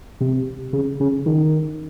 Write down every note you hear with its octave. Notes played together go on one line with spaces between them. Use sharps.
C3
C#3
C#3
D#3